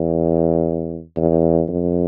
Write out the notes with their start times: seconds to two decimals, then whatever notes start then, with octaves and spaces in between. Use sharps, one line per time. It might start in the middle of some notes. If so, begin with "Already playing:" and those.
Already playing: E2
1.17 E2
1.69 F2